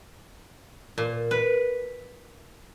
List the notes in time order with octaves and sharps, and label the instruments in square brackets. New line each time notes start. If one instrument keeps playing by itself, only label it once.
[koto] A#2
B4